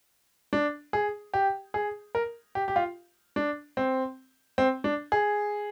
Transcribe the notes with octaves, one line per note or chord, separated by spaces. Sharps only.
D4
G#4
G4
G#4
A#4
G4
G4
F4
D4
C4
C4
D4
G#4